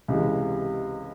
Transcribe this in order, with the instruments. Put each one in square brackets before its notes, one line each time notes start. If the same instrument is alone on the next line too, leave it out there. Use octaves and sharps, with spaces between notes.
[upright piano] C#2 C3 E3 G#3